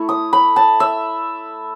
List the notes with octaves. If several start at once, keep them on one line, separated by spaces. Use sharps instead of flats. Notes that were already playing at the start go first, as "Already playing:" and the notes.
Already playing: A3 E4 C#6
D#6
B5
A5
E5